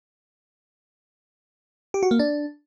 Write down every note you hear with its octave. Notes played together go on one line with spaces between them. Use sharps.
G4
F#4
A#3
D4